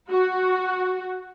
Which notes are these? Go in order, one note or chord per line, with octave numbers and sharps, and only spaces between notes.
F#4